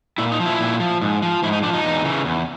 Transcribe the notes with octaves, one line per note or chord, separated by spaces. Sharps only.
A#2 E4
D#4
F3
E4
A#2
F3
G#2
F3
G#2 E4
D#4
F3 D4
D#4
E2
C#3 E3
E2